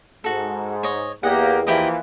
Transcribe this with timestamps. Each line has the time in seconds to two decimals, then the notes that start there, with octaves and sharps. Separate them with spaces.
0.24 G#2 F#4 A4
0.83 C#5 D#5
1.23 E2 A#3 G4 D#5 F#5
1.67 E3 F3 A#3 E4 G4 D#5